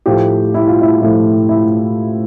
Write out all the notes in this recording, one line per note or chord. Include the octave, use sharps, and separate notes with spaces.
A2 F3 A3 G4
E4
F4
E4
A2 F3 A3 E4
E4